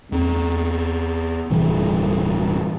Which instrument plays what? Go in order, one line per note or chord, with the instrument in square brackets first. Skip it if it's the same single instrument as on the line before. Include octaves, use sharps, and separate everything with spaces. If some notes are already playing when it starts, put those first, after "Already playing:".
[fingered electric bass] E2 C4
D1 G2 C3 E3